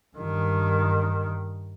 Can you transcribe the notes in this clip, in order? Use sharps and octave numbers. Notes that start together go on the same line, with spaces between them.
G2 D#3